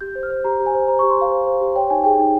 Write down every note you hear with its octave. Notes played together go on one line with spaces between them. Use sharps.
G4 G6
C5
F6
C5
G4 A#5
G4
G#5
C5
C5 A#5
C#6
G4
C6
G4 F5
C5
C5
G4
C#5 G5
D#4 G#5
G#4 G5
D#4